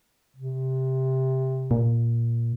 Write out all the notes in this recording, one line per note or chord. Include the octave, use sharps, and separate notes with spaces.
C3
A#2